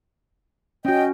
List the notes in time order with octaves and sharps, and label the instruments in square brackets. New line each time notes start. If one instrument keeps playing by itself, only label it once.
[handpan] C#4 F#4 [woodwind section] D#5 G5